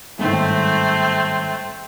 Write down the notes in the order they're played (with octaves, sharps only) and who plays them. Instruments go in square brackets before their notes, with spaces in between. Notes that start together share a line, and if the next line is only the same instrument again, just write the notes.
[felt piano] G1 G#2 D#3 [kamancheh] A3 C4